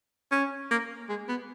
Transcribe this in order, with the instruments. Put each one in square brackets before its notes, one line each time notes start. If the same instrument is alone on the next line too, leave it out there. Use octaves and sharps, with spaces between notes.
[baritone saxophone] C#4
A#3
G#3
B3